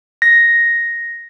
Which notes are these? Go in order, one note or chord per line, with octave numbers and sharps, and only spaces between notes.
A#6